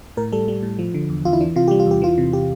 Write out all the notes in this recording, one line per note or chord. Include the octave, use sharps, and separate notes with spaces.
A2 A#4
G3 A4
G3
A2
F3
D3
E2
E2 F4
E4
E3 D4
C3 F4
G3 G4
F4
E2 G4
E3 F4
C3
G4